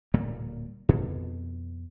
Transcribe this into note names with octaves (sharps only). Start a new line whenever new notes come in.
D1 A#2 G3 A#3
F2 B2